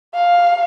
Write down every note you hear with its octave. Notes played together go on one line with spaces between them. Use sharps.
F5